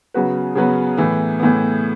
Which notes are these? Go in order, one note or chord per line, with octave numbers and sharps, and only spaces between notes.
C#3 F#3 B3 F#4 B4
C#3 F#3 B3 F#4 B4
A2 E3 B3
A2 E3 B3